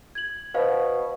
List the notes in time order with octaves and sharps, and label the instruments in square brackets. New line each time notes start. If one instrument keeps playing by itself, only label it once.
[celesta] G#6 F#7
[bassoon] B2 [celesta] C5 F5